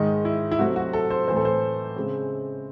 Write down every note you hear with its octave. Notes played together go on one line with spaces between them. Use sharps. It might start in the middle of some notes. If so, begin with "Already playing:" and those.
Already playing: G#2 D#3 G#3 D#5
E4
E4
C3 F#3 A3 C4 F#4
F#4
A4
C5
A2 E3 C4 C5
A4
C5
C#3 G#3 C4